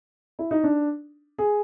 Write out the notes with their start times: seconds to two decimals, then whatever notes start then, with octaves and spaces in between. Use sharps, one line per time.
0.39 E4
0.51 D#4
0.64 D4
1.38 G#4